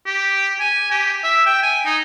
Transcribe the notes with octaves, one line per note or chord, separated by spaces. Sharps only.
G4
G#5
G4
E5
G5
G#5
D#4